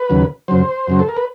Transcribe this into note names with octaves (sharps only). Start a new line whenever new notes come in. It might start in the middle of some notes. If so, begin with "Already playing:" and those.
Already playing: B4
D#2 C#3 F#3
F#2 C#3 F#3 C5
F#2 C#3 F#3
A4
A#4
B4